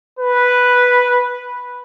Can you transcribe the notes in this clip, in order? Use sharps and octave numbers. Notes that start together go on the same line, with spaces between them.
B4